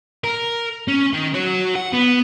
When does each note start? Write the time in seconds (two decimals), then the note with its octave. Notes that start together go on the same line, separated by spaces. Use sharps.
0.24 A#4
0.88 C#4
1.13 D#3
1.34 F#4 C#5
1.75 F#5
1.93 B3